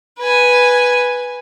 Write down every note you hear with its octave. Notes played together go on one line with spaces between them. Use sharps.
B4 G#5